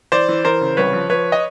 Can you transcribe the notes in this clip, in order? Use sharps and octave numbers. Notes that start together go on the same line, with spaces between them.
E3 C5 D5
E3
E3 A#4 C5
C#3
C2 B4 C#5
F3
F3 B4 C#5
D#5